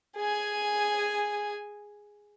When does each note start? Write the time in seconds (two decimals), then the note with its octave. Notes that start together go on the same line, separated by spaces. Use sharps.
0.17 G#4 G#5